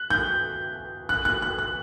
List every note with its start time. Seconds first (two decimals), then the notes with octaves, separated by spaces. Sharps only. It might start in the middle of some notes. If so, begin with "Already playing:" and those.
Already playing: F#6
0.10 G6
1.09 F#6
1.25 F#6
1.42 F#6
1.59 F#6